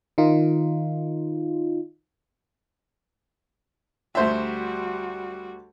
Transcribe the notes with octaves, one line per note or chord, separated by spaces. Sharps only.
D#3 D#4 F4
D2 G3 F#4 C5 E5